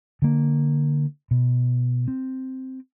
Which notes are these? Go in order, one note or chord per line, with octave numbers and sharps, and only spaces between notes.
D3 A#3
B2
C4